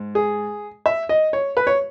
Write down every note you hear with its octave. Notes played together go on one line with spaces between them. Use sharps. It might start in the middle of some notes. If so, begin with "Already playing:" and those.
Already playing: G#2
G#4
E5
D#5
C#5
B4
C#5